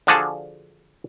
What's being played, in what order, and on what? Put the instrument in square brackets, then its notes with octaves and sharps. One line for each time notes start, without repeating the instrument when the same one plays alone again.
[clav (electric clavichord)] D3 F3 D4 F#4 G#4 A4